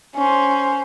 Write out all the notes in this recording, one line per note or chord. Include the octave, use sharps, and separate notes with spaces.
C#4 C5